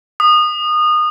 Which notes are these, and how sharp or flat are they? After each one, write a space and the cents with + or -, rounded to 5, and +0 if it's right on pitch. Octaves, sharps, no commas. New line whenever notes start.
D#6 -25